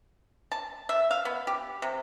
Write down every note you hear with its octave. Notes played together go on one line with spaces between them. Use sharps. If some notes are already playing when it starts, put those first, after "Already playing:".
A5
E5
F5
B3
G4
C3